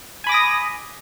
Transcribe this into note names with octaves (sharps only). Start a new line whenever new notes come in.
G#5 B5 D6 D#6 A#6